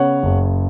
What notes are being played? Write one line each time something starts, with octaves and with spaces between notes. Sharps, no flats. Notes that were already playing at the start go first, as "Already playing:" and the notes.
Already playing: C#3 B3 C#5 F#5
F#1